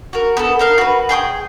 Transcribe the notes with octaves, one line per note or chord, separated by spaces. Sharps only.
F#4 A#4
B3 A4
D#4 A#4 F5
F#4 B4
G#4 G5 C6 D#6